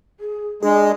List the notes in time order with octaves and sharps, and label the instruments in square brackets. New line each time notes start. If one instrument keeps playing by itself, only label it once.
[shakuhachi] G#4
[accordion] G#3 [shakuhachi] D4 [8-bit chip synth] G#4